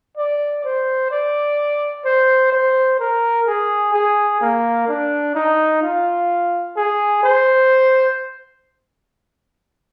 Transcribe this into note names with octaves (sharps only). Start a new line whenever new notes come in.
D5
C5
D5
C5
C5
A#4
G#4
G#4
A#3
D4
D#4
F4
G#4
C5